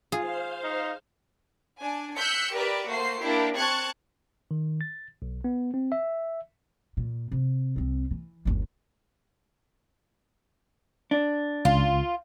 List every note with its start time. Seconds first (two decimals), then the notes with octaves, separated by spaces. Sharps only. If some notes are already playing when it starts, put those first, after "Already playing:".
0.12 F4 G#4 C5 F5
0.64 D#4
1.80 D4 G#5
2.17 E6 F#6 G6 B6 C#7
2.53 G4 A#4 B4 D5 E5
2.88 A3 A#3 F#4 C5 C7
3.22 A#3 D4 E4 G4
3.56 C4 A5 C#6 F#6 G#6
4.51 D#3
4.81 A6
5.22 B1
5.44 B3
5.74 C4
5.92 E5
6.97 A#2
7.32 C3
7.76 C2 C4
8.11 E3
8.45 G1 D#2
11.11 D4
11.65 C#2 F4